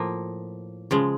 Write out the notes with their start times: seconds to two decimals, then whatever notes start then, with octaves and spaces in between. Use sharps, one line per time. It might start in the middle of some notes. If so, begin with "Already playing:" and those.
Already playing: A2 F3 A#3
0.91 C#3 F3 G#3